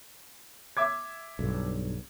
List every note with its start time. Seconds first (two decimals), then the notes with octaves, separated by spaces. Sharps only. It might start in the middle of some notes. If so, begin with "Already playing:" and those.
0.77 E5 D6 G#6
1.39 B1 G2